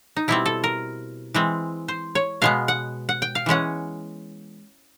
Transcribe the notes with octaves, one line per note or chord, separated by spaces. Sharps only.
D#4
B2 G3 C4 E4
A4
A#4
E3 G#3 C4
C5
C#5
B2 G#3 B3 F5
F#5
F#5
G5
F5
E3 G#3 C#4 F#5